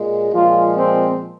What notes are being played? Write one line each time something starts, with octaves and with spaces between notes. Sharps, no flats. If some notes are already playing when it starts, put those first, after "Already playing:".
Already playing: A#2 G#3
A#2 F3 G#3 F4
C4